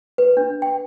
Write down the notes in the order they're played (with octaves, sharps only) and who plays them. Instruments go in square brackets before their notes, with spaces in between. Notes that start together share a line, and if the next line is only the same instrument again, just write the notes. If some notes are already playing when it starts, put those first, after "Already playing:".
[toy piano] B4
D4
G5